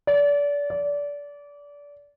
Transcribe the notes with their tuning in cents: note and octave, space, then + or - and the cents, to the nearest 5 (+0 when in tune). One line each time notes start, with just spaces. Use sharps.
D5 -30
D5 -25